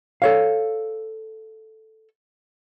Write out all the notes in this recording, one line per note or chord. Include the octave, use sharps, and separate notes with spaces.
A4 C#5 F5